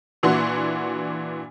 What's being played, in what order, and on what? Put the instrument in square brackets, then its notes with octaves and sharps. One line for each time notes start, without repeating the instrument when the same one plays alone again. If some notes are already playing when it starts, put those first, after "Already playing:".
[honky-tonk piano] A#2 E3 D4 F#4 F#5 C6